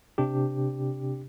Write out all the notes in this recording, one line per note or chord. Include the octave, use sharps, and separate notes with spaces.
C3 D4 G4